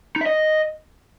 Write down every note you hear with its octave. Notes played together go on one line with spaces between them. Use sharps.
D#4
E5
D#5